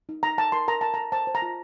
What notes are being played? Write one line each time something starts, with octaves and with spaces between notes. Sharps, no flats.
D#4
D#4 A#5
A#4 A5
A#4 C6
A#4 A#5
A#4 A5
A#4 A#5
C5 A5
C5
A#5
F4